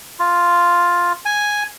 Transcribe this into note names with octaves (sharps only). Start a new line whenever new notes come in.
F4
G#5